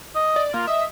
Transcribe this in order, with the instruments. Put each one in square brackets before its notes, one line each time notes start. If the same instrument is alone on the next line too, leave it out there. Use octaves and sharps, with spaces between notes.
[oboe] D#5
[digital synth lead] D5
[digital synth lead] A#3 [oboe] F4
[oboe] D#5 [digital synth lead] E5